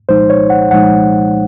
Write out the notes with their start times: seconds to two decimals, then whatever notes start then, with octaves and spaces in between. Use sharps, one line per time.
0.09 C2 A#2 F3 G#3 D#4 C5
0.30 C#5
0.50 F#5
0.71 C2 A#2 F3 G#3 D#4 F#5